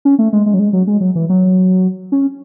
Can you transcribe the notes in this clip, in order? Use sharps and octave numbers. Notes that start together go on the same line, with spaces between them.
C#4
A3
G#3
G#3
F#3
G#3
F#3
G#3
F#3
E3
F#3
C#4